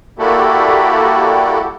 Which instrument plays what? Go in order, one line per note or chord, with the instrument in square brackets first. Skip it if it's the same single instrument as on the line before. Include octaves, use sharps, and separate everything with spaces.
[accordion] G3 A#3 E4 F#4 G4 A4